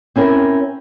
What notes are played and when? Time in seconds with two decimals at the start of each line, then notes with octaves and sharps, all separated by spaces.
0.16 C4 C#4 E4 A#4